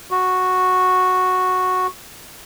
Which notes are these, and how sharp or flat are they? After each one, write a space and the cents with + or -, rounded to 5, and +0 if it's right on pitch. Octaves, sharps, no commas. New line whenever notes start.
F#4 -5